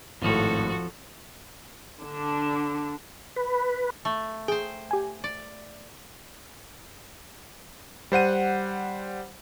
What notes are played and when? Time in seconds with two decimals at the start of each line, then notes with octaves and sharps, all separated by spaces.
0.22 G#1 F2 A2 F3 F#4 A4
2.03 D3 D4
3.36 B4
4.05 A3
4.48 G#4 C5 G5
4.91 G4 G#5
5.24 D5
8.12 G3 C5 F#5 D#7